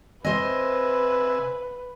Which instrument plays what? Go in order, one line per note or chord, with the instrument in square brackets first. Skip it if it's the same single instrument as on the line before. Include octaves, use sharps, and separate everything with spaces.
[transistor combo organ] C3 E5 G#5 [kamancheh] B4 [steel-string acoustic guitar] C5 D#5